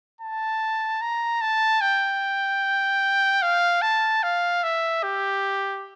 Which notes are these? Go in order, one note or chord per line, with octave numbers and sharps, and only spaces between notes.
A5
A#5
A5
G5
F5
A5
F5
E5
G4